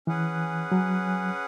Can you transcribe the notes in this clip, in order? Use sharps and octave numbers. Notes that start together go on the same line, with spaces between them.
E3 C#4 G#4 B4 F#5
F#3